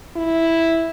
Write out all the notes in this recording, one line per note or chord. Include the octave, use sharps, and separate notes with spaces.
E4